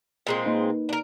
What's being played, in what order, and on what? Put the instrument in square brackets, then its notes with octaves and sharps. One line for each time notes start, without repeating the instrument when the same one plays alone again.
[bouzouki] A#2 G#3 C4
[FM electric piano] A#3 D#4 B4
[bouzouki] D4 A#4